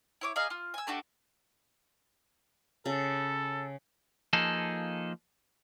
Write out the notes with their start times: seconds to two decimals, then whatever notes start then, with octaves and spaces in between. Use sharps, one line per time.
0.21 E4 C#5 D6
0.36 G#4 D#5 F5 A#5
0.50 F4
0.74 G#5 E6
0.87 A3 D4 F#4 G4
2.86 C#3 A4
4.33 F3 A#3 D#4 G#4 A4